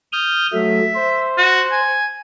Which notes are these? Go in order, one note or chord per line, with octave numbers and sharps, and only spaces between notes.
D#6 F6 G6
F#3 A3 E5
C5
F#4
G#5